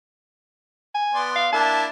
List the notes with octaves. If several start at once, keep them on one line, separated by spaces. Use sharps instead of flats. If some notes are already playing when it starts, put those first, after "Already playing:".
G#5
B3 D5 C6
F5
A#3 D4 E4 A5